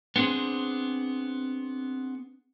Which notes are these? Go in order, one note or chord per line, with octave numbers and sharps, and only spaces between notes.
B3 C4 D4 G#4 C5